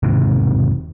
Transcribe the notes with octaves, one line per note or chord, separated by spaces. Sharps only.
E1 G#2 C3 D#3